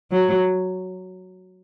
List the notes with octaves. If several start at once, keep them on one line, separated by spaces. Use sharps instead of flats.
F#3